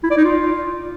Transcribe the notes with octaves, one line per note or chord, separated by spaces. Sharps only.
E4
D5
D#4
F4